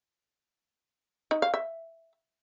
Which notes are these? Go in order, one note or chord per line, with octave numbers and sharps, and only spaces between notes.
D#4
F5
E5